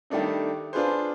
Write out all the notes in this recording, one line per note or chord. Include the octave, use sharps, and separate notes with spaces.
D#3 G3 A3 D4 D#4
D4 F4 G#4 B4 C5